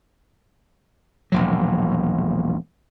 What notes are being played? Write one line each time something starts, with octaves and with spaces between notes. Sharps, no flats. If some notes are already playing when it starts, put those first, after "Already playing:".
E1 A#1 F#3